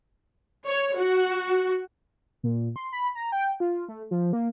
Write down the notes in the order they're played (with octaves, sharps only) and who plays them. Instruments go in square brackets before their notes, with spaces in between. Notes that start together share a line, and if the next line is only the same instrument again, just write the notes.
[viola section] C#5
F#4
[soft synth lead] A#2
C6
B5
A#5
G5
F4
A3
F3
A#3